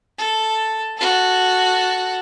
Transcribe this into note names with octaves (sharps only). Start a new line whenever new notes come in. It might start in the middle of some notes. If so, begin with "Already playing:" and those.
A4
F#4 A4